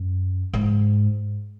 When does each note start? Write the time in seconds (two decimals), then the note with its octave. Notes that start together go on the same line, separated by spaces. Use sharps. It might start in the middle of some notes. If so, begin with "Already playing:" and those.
Already playing: F#2
0.53 G#2